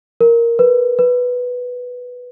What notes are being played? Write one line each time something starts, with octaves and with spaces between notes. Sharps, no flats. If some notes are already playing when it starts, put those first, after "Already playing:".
A#4
B4
B4